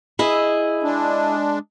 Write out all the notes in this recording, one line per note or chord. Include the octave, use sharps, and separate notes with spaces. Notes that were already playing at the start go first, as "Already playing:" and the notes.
E4 G#4 D#5
G#3 D4